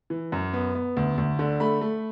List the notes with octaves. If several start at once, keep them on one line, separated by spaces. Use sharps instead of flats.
E3
F#2
B3
B3
D2
D2
D3
A3 B5
A3